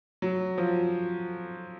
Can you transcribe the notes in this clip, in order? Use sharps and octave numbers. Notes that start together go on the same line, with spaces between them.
F#3
F3